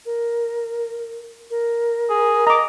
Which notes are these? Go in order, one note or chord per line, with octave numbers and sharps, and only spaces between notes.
A#4
A#4
G#4
D#5 A#5 D6